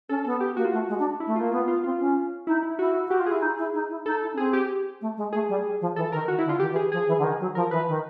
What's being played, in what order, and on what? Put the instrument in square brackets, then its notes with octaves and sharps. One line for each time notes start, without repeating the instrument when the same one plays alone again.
[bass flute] C#4 [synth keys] A4
[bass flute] B3 [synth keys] A4
[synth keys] G4
[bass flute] A#3 [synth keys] F#4
[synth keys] F4
[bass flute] A3 [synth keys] F#4
[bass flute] G#3
D4
[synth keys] E4
[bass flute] A3
[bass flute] A#3 [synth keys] F4
[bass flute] B3 [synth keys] F4
[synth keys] F4
[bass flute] C4 [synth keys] F4
[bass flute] C#4
[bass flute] D#4 [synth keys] E4
[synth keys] E4
[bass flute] E4 [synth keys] F#4
[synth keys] F#4
[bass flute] F#4 [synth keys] G4
[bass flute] F4
[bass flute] E4 [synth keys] G#4
[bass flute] D#4
E4
D#4
E4
[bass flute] D#4 [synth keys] A4
[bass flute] E4
C#4
[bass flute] C4 [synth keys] G#4
[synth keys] G4
[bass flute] A3
G#3
[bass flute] A3 [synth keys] G#4
[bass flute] G3
F3
[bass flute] E3 [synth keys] A4
[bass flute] D#3 [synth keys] A#4
[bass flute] D#3 [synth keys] F#4
[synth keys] E4
[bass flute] D3
[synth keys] F4
[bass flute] D#3 [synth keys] G4
[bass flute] E3
[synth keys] G#4
[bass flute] F3 [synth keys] G#4
[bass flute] E3
D3
D#3
F#3
[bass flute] F3 [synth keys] A#4
[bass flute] E3 [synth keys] B4
[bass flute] D#3